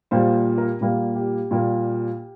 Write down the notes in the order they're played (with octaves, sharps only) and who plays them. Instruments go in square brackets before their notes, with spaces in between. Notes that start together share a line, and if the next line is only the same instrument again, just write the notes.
[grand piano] A#2 G3 A#3 C5
A#4
A#2 G3 A#3
G4
A#2 G3 A#3